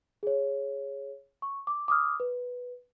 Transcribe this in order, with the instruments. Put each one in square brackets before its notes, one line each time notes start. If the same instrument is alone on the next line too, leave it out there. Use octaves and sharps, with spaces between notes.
[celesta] G#4 C#5
C#6
D6
D6 D#6 F6
B4